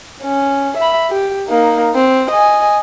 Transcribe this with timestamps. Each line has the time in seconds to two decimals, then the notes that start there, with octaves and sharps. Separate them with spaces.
0.22 C#4
0.77 E5 B5
1.10 G4
1.48 A#3 D#4
1.95 C4
2.31 D#5 G#5